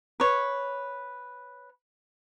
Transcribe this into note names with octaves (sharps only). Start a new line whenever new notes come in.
B4 C#5